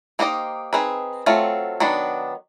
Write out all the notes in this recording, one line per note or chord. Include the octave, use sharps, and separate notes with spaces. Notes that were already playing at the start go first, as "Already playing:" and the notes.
A#3 D#4 G4 C5 D#5
C4 D#4 G#4 B4
F#3 A3 C4 F4
D#3 F#3 B3 D4